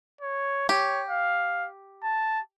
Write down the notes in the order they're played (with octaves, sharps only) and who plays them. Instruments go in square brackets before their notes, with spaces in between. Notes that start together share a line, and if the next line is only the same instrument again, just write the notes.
[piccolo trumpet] C#5
[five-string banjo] G4 [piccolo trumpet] C#5
[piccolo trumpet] F5
A5